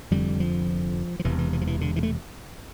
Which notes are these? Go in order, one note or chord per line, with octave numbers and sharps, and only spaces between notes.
F1 F2 D3 G3
F3
F3
E1 E2 C3 E3
E3
E3
F3
E3
D3
E3
A3